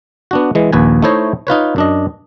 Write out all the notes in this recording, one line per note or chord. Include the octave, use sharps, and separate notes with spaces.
B3 D4 F#4
E3 G#3
A#1 D#2 B4 G#5
A3 D#4 E4 C5 C#5 D#5
D#4 F4 B4 C#5
F#2 D4 D#5